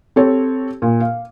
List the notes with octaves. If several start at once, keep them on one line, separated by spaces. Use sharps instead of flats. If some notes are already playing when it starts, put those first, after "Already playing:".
C4 G4 A4 C#5
A#2
F5